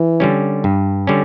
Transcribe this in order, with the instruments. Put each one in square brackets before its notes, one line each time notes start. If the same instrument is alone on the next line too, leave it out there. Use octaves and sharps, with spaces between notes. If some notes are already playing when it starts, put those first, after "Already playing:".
Already playing: [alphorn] E3
[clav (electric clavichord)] D3 G3 C#4
G2
D3 G3 C#4